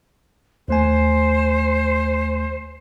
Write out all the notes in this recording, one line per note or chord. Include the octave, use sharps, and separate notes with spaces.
D#2 A3 C5 G#5